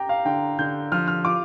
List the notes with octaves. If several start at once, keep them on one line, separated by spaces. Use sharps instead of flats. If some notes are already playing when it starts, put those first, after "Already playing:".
Already playing: G4 G5 A#5
F5
D3 G5
D3 G6
F3 F6
F6
F4 D6